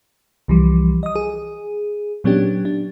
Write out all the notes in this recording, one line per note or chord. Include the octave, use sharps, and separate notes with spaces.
C2 E3 F3 G3
D#5 D#6
G#4
A#2 F#3 B3 C#4 D4 G4
D4